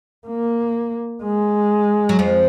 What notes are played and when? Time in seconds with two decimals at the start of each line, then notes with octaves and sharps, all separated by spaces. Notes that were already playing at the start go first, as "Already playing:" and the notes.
0.28 A#3
1.23 G#3
2.09 F#3
2.19 F2 F3